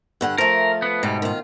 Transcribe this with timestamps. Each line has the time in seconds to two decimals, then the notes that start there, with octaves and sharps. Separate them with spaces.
0.21 G2 D3 F#5
0.38 F3 A3 A#4
0.82 B3
1.03 G#2 B2 G3
1.22 D#3 F4